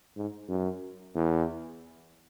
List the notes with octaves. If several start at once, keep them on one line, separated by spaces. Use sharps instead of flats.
G#2
F#2
E2